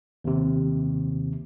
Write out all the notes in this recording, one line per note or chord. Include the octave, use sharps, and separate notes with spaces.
D#2 C3